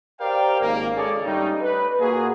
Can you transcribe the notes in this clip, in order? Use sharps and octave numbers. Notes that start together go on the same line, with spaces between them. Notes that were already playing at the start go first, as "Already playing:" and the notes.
G4 A#4 C5 D5 F5 G5
G#1 C#3 A#3
C#3 G#3 G#4 A4 C#5 D5
G2 G3 A3 C#4 D#4
B4
A#2 A#3 F#4 G#4